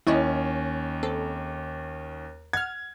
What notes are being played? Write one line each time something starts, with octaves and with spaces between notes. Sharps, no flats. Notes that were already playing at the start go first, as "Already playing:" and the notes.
D#2 C#4 E4 C#5 D#5
C4 A4
F#5 F6 G#6